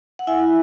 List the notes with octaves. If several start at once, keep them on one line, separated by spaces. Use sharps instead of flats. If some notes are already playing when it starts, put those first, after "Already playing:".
F#5
E4 E5 G#5